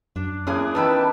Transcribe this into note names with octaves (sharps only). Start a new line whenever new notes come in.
F#2 D4
A#3 B3 C#4 D4 E4 G#4
E2 D#3 E4 G4 B4 G5 A5